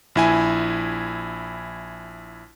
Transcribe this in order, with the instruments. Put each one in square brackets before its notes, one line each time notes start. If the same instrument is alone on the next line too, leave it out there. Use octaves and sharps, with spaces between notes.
[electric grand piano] A#1 E4 G#5